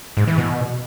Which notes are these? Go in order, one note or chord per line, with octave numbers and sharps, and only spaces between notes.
G#2
E3
B2